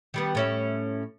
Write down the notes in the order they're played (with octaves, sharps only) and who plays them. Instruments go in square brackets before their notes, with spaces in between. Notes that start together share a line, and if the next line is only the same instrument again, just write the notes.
[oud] D#3 G3 B3
A2 C#4 E5